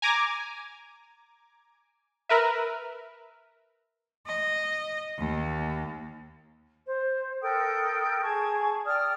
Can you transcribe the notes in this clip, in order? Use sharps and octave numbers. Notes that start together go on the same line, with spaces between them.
G#5 A#5 D6 G#6
A#4 B4 E5
D#5
D#2
C5
A4 A#4 G5 D#6
G#4 A5 C#6 G#6
D5 G5 D#6 F6